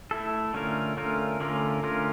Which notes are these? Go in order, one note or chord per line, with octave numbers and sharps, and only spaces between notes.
A3 E4 A4
D3 A3 C#4 F4 A#4
D3 A3 C#4 F4 A#4
D3 A3 C#4 F4 A#4
D3 A3 C#4 F4 A#4